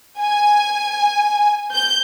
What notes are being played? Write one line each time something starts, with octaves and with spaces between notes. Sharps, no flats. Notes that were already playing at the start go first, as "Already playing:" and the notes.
G#5
G6